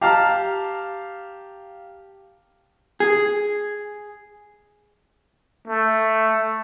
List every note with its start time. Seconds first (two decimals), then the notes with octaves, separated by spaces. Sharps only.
0.01 G4 F5 A5 A#5 F6
3.00 G#4
5.68 A3